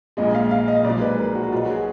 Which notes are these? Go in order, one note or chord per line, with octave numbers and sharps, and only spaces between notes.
A#1 A#2 G#3 D#5
F5
F5
D#5
B1 A#2 F3 G#3 D5
B4
A#4
F#4
B1 B2 F#3 F4
F#4
G#4